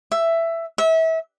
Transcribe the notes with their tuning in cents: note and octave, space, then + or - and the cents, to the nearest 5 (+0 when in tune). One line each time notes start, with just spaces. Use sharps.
E5 +10
E5 -30